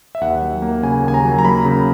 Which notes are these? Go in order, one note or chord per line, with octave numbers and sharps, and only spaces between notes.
E5
D#2 F#5
F#3
A#3
C#3 G#5
D#2 G#5
A#5
F#3
A#5
A#3 B5
C#3